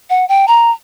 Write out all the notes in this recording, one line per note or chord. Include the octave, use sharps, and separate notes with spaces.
F#5
G5
A#5